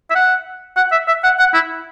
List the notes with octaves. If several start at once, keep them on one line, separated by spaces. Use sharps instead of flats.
E5
F#5
F#5
E5
E5
F#5
F#5
E4